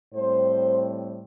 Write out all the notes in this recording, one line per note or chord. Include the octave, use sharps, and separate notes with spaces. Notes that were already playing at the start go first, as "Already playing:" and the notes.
A2 G3 C4 C5